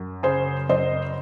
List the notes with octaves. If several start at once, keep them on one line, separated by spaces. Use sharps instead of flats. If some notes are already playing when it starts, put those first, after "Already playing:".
Already playing: F#2
C#3 G#4 C5
F#2 C5 D#5